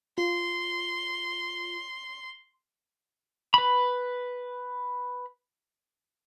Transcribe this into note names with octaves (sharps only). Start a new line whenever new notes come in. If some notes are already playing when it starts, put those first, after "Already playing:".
F4 C6
B4 B5